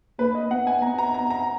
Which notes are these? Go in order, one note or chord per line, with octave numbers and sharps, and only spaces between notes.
A#3 B4
D#5
B3 F#5
G#5
B3 A#5
A#5
A#5
A#5